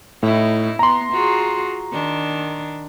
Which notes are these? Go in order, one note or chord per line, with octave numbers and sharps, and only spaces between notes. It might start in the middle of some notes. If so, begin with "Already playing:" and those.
A2 D#4 E4
B3 A#5 C6
F4 F#4 G#4
D#3 D4